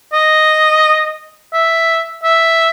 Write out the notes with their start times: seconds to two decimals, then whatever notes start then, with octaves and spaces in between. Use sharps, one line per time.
0.13 D#5
1.54 E5
2.24 E5